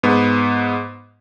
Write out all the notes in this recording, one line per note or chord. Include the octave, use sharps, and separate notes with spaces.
G#2 B3